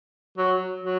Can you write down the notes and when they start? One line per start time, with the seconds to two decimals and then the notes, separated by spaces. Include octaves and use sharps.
0.38 F#3
0.84 F#3